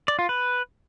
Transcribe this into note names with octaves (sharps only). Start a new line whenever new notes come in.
D5
F4
B4